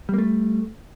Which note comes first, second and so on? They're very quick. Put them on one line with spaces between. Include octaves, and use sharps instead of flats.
G3 A#3 A3